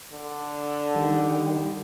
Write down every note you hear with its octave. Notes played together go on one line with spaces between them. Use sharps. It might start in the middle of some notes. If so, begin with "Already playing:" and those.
D3
D#3 G3